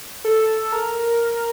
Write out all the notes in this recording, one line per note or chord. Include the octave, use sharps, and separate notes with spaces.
A4
A#4